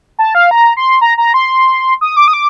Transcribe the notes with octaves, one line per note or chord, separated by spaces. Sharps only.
A5
F5
A#5
C6
A#5
A#5
C6
D#6
D6
D#6
D6